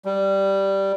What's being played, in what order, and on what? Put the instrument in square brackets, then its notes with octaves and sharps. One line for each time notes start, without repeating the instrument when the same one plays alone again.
[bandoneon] G3